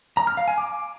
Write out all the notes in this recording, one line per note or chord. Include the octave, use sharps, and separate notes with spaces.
A#5
F6
F5
G#5
D6